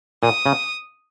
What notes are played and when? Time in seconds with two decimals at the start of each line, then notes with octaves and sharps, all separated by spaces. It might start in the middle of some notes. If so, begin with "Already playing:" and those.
0.23 A#2 D#6
0.46 C#3